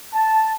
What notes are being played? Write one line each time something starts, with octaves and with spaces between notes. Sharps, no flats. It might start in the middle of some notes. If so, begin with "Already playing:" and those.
A5